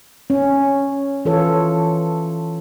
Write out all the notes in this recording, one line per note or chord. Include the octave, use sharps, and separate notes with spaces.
C#4
E3 F4 A4 C#5